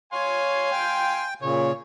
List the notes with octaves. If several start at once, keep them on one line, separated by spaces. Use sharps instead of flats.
C#5 F5 G#5 C6
G5
A#2 C#3 C#5